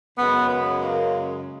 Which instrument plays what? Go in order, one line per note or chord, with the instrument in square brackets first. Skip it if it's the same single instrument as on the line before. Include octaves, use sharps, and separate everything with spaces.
[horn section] F#2 C#3 G#3 B3
B3
A#3